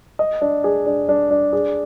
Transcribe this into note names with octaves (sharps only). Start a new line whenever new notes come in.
D#5
D4
G#4
D4
D4
D4
G#4